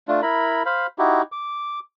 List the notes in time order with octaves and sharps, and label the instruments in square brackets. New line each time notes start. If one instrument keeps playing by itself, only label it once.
[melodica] A3 D4 F4
E4 A#4 B5
C5 F5 B5
D#4 E4 F#4 G4
D6